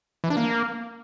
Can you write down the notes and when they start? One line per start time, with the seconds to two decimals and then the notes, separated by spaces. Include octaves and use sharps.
0.24 E3
0.30 D4
0.37 A#3